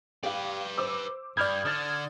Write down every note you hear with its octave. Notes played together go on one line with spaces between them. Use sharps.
G4 B4 D5 F5
C5 D6 E6
G2 D5 B5 D#6 F6 G6 G#6
D3 D#6 A6